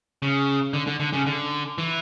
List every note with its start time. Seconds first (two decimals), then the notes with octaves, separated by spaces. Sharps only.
0.22 C#3
0.74 D3
0.87 D3
1.00 D3
1.13 C#3
1.26 D3
1.78 E3